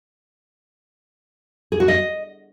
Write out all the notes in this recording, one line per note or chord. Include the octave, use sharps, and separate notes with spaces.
G#4
F#4
D#5